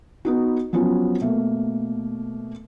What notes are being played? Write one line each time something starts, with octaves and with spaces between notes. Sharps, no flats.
B3 D#4 F#4
F3 F#3 B3 C#4 F4
B2 A3 A#3